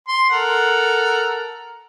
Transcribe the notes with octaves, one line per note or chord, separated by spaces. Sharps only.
C6
A4 A#4 F#5